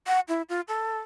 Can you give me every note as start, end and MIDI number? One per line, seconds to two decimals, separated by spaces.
0.07 0.20 78
0.28 0.42 64
0.49 0.61 65
0.68 0.98 69